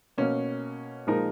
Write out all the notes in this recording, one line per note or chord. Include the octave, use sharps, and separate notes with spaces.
B2 A#3 C#4
A#2 F3 G#3 D#4 A#4